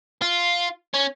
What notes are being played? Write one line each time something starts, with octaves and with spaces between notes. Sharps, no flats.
F4
C#4